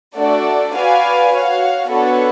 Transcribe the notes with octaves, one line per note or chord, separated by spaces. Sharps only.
A3 D4 F#4 A4 D5
F#4 B4 D5 F5 G#5
F#4 C#5 F5
B3 D4 F#4 A4 C#5